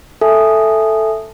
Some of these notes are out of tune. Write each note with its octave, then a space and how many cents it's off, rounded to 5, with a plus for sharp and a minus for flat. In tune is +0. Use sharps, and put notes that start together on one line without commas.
A4 +0 E5 +0 G#5 +0